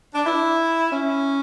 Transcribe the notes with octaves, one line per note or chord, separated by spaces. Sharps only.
D4
E4
C#4